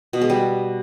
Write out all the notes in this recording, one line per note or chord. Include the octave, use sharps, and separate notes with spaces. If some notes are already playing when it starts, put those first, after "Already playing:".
B2
G#3
G3